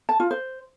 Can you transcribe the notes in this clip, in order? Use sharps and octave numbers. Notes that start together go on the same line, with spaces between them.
A5
F4
C5